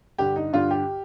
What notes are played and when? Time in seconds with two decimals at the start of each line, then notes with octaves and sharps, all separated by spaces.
0.18 G2 D3 G4
0.36 D#4
0.53 G2 D3 F4
0.71 G4